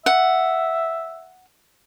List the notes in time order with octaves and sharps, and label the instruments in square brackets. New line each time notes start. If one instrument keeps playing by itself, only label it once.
[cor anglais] E5 [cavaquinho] F#5